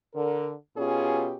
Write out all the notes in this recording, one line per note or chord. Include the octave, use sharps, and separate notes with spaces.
D3 A#4
B2 C#4 F4 G4 G#4